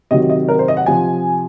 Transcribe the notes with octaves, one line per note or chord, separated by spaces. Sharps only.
C3 D#3 F#3 D#5
D#5
A#4
C5
D#5
F#5
C3 F3 G#5